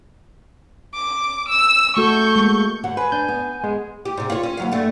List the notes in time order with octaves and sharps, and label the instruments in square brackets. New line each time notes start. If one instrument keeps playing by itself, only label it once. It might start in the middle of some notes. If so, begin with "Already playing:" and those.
[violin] D6
E6
[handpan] A3 F#4 A4 [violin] C#6 G6
[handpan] G#3 A#3
[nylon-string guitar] D#2 F#4 F#5
[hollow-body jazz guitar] B4 [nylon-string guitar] C5 [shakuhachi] G#5
[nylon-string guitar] D4 [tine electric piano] G6
[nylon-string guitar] B3
[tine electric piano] G#3 [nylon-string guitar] B3
[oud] G4
G#2 C3
F4 C#5
C#4
D#2 F#3 F5
G2 A3